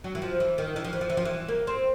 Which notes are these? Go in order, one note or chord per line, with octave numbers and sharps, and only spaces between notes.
F#3
E3
F3
E3
D#3
E3
F3
E3
F3
E3
F3
E3
A#3
C4